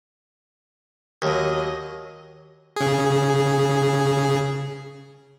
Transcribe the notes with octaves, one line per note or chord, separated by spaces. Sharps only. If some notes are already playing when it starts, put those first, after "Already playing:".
D#2 F#3 D#5
C#3 G#4